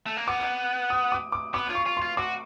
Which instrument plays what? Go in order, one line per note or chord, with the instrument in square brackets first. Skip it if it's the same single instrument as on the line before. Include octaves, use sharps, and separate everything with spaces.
[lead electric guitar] A3
A#3
[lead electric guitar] B3 [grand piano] D6
[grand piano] D#6
D6
D6
[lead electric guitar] B3 [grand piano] D6
[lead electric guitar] F4
[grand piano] C#6
[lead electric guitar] F4
[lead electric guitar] F4 [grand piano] C6
[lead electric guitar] F#4 [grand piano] D6